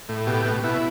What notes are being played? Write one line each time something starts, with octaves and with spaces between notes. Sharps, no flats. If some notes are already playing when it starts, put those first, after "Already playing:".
A2
B2 G4
B2
B2 E4